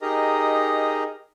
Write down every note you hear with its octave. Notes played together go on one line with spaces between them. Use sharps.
D#4 G4 G#4 A#4 D#5 A#5